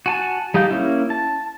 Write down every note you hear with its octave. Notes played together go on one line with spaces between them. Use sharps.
F#4 G#5 A5
G3 D#4 G4 F5 G6
A#3 C#4 E4
A5